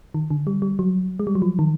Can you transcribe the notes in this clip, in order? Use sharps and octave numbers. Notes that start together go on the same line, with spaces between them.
D#3
D3
G3
G3
F#3
G#3
G3
F#3
F3
D#3